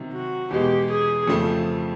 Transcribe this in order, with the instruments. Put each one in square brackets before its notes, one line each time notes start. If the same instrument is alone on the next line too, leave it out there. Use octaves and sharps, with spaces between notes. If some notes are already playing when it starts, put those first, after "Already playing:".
Already playing: [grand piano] C3 D#3 F#3
[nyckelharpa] F#4
[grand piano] E2 B2 G#3 [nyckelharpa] G4
[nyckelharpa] G#4
[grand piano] F2 C#3 F3 A3 C4